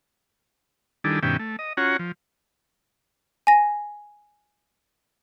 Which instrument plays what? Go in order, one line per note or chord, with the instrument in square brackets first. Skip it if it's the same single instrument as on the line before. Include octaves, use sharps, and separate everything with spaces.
[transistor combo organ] D#3 G3 D4 E4 G#4 A4
G2 B2 D#3 C#4 E5 G5
A3
D#5
C#4 F4 F#4 C#5 F#5 A#5
F3
[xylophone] G#5 A#6